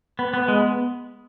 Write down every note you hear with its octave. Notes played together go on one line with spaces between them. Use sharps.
B3
B3
G#3